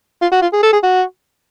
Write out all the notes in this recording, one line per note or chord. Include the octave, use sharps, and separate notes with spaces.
F4
F#4
F4
G#4
A4
G#4
F#4